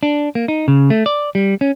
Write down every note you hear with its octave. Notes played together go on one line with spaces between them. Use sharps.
D4
A#3
D#4
C#3
A3
D5
G3
C#4